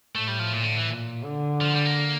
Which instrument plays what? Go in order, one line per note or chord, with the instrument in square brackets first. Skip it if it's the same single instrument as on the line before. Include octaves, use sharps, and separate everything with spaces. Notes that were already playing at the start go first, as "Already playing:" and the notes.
[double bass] A2 [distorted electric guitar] A3
[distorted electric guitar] G3
F3
A#2
D3
E3
[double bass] A#2
D3
[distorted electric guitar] F3
G3
A#3